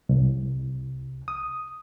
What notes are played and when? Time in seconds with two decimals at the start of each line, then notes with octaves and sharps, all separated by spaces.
0.09 C2
1.28 D#6